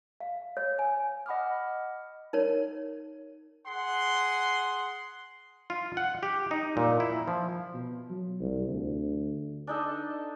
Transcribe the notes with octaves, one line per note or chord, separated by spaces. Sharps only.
F5
C#5
G#5
D#5 F#5 B5 D6 D#6 F6
D#4 A#4 C#5
G#4 F#5 C6
F4
F#5
G4
D#4
A#2
E4
F3
B2
F#3
C2
D2
D4 D#4 A4